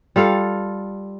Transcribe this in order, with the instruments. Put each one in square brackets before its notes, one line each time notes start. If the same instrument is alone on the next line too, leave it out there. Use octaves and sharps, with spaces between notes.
[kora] G3 F4 A4 F5